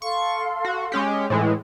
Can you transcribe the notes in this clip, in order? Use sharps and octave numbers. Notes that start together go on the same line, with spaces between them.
A4 F5 C6 C#6
F#4
G#3 C#4 G4
A2 E3 G#3